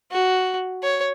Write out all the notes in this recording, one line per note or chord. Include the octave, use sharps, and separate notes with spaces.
F#4
C#5